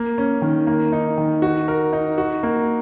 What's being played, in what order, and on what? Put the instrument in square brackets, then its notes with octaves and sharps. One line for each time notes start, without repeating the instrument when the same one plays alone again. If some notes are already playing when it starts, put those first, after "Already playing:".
Already playing: [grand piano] A#3
C#4
D#3
A#3
D#4
D#3
F#4
A#4
D#4
F#4
A#3